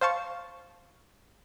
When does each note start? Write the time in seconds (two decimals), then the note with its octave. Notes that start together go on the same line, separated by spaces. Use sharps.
0.01 C5 F5 A5 C#6